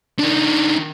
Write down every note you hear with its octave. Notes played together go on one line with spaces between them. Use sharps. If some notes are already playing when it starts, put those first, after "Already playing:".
D#3 D4